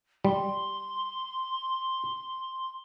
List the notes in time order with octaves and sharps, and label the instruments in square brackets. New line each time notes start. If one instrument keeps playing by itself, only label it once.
[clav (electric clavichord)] G3 [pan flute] C6